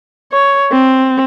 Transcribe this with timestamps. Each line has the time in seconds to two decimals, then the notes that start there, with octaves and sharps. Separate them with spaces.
0.32 C#5
0.72 C4